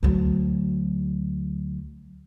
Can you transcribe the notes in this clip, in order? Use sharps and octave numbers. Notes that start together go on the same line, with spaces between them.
D2 F#3